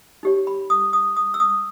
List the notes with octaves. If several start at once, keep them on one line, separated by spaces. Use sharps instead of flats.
D#4 G4 C#5
B5
D#6
D#6
D#6
E6
D#6